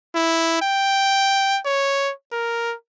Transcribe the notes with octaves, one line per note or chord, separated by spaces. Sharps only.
E4
G5
C#5
A#4